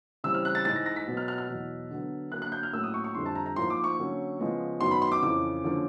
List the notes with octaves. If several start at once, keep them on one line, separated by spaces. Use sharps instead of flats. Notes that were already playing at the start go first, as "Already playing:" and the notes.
C#3 E3 G3 C4 E6
F6
F#6
A6
G#2 E3 G#3 A6
A#6
A#6
B6
B2 F#3 B3
F6
F6
F6
E2 B2 F#3
D3 F#3 B3
D3 F#3 A#3 F#6
F#6
G6
F6
A2 F#3 A#3 C#4 E6
D#6
C#6
C#6
F2 D3 G3 C6
A5
A#5
A#5
G#2 F3 A#3 C6
D6
C#6
D3 F#3 A#3 C#4
C#3 F3 G#3 B3
F#2 D#3 F#3 B3 C6
B5
C6
D6
F2 C#3 E3 D6
D3 F3 A#3 C#4